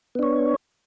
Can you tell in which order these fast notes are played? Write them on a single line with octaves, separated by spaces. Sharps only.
B3 D4 C#5